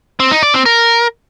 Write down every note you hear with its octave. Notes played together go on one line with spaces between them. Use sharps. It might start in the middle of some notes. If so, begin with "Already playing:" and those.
C4
D#4
D5
C4
A#4